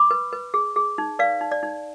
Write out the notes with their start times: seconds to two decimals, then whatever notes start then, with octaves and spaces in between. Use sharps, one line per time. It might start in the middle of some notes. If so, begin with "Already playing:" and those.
Already playing: B5 D6
0.11 B4
0.33 B4
0.54 G#4
0.76 G#4
0.98 D#4
1.19 B4 D5 F5
1.41 D#4
1.51 D5
1.63 D#4